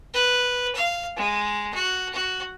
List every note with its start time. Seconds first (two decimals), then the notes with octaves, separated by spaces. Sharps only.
0.14 B4
0.75 F5
1.17 G#3
1.74 F#4
2.13 F#4